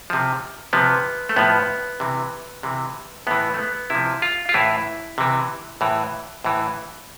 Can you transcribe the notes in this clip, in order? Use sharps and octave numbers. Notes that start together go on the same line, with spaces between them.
C3 F3
C3 F3 B3
A3
A2 F3 B3
C3 E3
C3 E3
A2 E3 B3
A3
B3
C3 F3 E4
F4
F4
A2 E3 E4
C3 E3
A2 E3
A2 E3